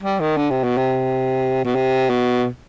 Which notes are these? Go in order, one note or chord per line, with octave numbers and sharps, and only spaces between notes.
G3
D#3
D3
C3
B2
C3
B2
C3
B2